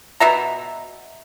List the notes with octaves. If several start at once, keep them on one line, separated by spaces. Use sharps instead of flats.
B2 E5 A#5